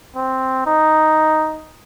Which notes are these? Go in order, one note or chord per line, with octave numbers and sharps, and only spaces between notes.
C4
D#4